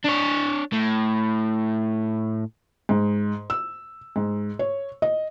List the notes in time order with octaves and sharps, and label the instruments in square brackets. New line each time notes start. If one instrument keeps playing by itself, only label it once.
[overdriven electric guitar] D4 C#5
A2
[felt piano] G#2
E6
G#2
C#5
D#5